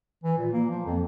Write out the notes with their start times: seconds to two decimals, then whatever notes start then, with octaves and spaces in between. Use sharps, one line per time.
0.24 E3
0.38 A#2
0.53 A#3
0.70 F3
0.86 F2